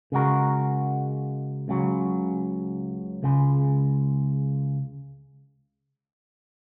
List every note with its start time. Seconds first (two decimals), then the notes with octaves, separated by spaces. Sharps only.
0.12 C#3 G#3 F#4 A#4
1.68 C#2 C#3 F#3
3.23 C#2 C#3 G#3